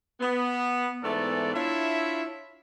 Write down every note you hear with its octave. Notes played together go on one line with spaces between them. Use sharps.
B3
G#2 E3 A3 B3 A4 D5
D4 E4 F4 C#5 E5